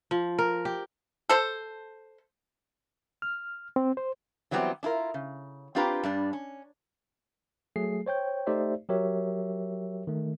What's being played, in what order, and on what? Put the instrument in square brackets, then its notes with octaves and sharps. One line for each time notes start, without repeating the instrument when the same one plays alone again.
[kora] F3
A#4
G4
[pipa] A4 C5
[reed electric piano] F6
C4
C5
[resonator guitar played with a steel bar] E3 F#3 G3 B3 C4 G4
D4 E4 F4 A#4
C#3
C4 D4 F4 G4 B4 A#5
G2 G3 D4
C#4
[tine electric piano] F#3 A3 G#4 C7
C5 C#5 G5 G6
A3 D#4 G4 C5 D5 E5
F#3 G4 A#4 C#5 E5
D#3 A3